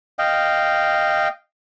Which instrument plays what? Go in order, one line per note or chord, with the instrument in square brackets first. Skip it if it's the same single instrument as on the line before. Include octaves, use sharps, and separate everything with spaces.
[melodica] D#5 F5 G5